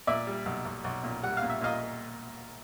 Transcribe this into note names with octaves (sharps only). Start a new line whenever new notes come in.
A#2 D5 E5
G3
B1
B1
B1
A#2
G3 F#5
F5
A#2
E5
A#2 D#5 F5